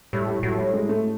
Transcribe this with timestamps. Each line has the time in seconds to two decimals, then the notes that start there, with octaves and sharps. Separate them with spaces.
0.13 A2 G3
0.27 G3
0.43 A2 F#3
0.58 G3
0.73 G#3
0.89 A3